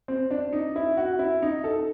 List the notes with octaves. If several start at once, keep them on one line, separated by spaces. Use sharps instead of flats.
C4
D4
D#4
E4
F#4
E4
D#4
A4